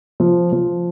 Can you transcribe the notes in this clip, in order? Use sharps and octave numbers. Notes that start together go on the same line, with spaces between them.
F3
F3